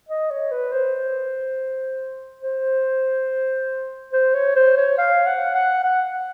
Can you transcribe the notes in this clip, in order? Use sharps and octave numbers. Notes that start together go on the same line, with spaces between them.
D#5
C#5
B4
C5
C5
C5
C#5
C5
C#5
F5
F#5
F#5
F#5